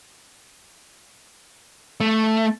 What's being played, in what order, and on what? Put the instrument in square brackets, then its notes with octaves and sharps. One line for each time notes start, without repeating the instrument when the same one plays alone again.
[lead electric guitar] A3